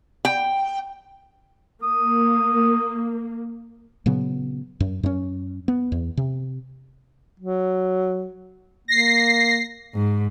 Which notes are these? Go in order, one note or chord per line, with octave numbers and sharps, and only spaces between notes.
G5
A#3 D#6
A#2 C#3 F#3 B3
F#2
F#2 C#4
B3
E2
C3
F#3
A#3 A#6 C7
G#2